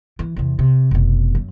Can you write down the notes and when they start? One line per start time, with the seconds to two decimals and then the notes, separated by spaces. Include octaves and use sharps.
0.19 E3
0.36 E2 C3
0.59 C3
0.91 F1 B2
1.35 F#2